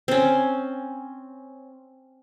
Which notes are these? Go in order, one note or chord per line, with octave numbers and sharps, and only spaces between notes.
C4 C#4